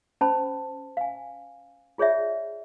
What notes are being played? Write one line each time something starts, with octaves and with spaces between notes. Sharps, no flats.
C#4 C5 A5 B5
F5 G#5
F4 G#4 C#5 D5 E5